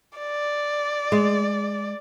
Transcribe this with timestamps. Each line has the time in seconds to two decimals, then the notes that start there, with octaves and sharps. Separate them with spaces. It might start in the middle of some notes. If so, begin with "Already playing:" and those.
0.18 D5
1.12 G#3